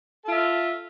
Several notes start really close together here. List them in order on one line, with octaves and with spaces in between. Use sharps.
A4 F4 E5